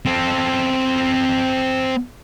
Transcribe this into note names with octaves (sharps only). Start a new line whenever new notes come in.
C4 A4